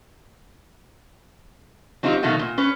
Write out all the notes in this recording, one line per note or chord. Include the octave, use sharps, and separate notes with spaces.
F#3 C4 D#4 F4 G4
B2 D#3 F#3 A3 A#3 F#4
A#2
C#4 B4